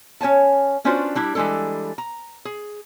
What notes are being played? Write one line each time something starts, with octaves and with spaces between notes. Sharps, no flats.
C#4 C#5 G#5 A5
B3 C#4 D4 F4 F#4 C5
G3 D4 E4
E3 G3 G#3 D4 A4
A#5
G#4